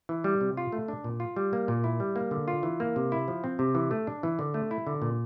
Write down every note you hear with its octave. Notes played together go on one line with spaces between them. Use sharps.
E3
G3
C3
F4
A3
D4
A#2
F4
G3
A#3
A#2
E4
G3
A#3
D3
F4
E3
A#3
C3
E4
F3
C4
C3
E3
A3
D4
E3
D3
A3
E4
D3
A#2